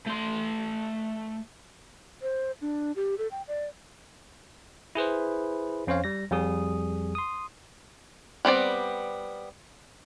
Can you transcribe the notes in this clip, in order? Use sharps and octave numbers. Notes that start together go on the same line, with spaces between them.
A3 C6
C5
D4
G4
A4
G5
D5
E4 G#4 B4 C5
F2 C#4 C5 C#5 F5
G3 A#6
F2 G3 G#4 D#6
C6 D#6
G3 B3 C4 D5